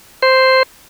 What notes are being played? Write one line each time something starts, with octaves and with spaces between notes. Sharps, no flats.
C5